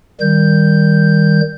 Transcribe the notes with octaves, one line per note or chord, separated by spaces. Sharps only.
D#3 G3 G6